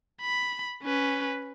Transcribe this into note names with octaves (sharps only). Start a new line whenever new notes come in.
B5
C#4 B4